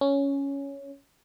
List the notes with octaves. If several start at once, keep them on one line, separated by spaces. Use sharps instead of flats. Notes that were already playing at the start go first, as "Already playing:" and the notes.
C#4